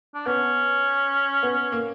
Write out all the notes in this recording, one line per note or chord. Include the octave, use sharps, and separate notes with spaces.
D4
B3 C#4
B3
A#3